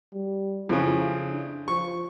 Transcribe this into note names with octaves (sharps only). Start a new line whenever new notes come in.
G3
F2 C#3 E4
D4
F3 C#6